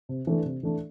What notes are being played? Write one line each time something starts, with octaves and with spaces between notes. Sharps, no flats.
C3
E3 A3 D4
C3
E3 A3 D4